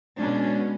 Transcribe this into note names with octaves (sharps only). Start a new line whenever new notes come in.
B2 G#3 C#4 D4